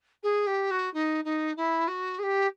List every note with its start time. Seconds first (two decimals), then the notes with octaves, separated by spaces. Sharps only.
0.23 G#4
0.47 G4
0.71 F#4
0.93 D#4
1.24 D#4
1.56 E4
1.87 F#4
2.19 G#4
2.23 G4